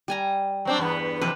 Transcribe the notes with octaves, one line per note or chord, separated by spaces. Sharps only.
G3 G#5 A#5
F#3 C4 D4
E2 G2 B3
F2 C3 E3 B4